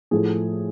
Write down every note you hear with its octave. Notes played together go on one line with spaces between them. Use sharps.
A2 F3 A3 G#4